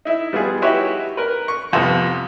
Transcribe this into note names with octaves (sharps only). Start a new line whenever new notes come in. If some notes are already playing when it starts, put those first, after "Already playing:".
D#4 E4
G3 B3 F4 G#4
D#4 E4 F#4 G4 B4 C#5
A#4 B4
C#6
C2 F2 C3 F3 B3